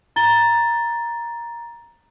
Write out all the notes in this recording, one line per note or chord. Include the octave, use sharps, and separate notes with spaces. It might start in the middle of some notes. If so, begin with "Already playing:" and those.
A#5 A6 G7